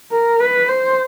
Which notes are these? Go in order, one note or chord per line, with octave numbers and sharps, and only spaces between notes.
A#4
B4
C5